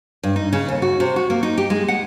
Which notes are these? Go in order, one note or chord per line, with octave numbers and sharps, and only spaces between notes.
G2
D#4
C#3
D#2
F#4
C3
F#4
A#3
D#4
G4
G#3
F#5